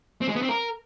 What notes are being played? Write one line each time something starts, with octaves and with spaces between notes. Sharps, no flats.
C4
G#3
B3
C4
A#4